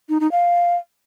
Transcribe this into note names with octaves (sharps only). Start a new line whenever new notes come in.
D#4
D#4
F5